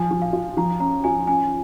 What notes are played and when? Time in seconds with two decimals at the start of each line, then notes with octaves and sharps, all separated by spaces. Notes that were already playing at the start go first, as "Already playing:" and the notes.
Already playing: F3 G#5
0.11 F3
0.22 F5
0.33 F4
0.57 F3 A#5
0.80 C#4 A#5
1.04 F4 G#5
1.27 C#4 G#5